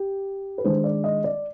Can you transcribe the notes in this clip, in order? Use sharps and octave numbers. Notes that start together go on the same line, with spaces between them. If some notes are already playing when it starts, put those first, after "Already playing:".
Already playing: G4
B4
D#3 G#3 D4 C5
D5
D#5
D5